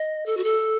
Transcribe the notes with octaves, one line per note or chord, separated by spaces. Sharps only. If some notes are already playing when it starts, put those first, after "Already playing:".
Already playing: D#5
A4
F#4
A4